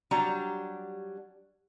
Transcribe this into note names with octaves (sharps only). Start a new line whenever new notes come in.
F#3 G3 D4 G4 A#5